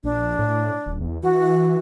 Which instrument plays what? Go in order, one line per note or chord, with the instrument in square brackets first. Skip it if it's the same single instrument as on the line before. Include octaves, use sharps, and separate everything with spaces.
[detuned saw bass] A#1 [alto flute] D4
[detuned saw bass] A2
D#1
E2
[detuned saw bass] E3 [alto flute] F#4